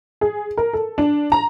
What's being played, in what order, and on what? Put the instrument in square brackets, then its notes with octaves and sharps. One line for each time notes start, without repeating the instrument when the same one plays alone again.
[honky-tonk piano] G#4
A#4
A4
D4
A#5